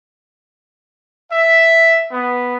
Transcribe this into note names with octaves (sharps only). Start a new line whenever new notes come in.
E5
B3